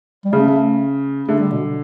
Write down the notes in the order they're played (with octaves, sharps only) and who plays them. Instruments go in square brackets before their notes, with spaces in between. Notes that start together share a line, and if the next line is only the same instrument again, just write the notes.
[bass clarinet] G3
[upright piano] C#3 [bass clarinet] A3
[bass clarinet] A3
[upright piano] D3 [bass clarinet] A3
[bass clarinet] G3
B2